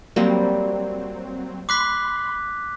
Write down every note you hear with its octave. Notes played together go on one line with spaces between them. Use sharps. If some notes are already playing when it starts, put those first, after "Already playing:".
F#3 G3 A#3 C4
B5 C6 D6 F#6 B6